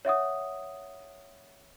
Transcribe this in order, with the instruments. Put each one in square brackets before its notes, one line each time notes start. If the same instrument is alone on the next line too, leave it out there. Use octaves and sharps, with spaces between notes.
[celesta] C#5 E5 F#5 D#6